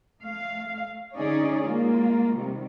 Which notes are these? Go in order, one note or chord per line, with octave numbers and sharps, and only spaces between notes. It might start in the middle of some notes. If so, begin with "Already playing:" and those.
A3 F5
D3 C#4 D#4 G#4 C#5 D5
G#3 A#3 F4
C3 D#3 G3